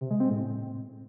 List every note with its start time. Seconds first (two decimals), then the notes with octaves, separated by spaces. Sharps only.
0.01 C3
0.11 G#3
0.20 C4
0.30 A2